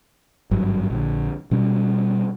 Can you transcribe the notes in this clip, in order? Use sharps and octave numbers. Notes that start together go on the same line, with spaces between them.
G#1 G2 F#3
A#1 D3
B2 G3 C#4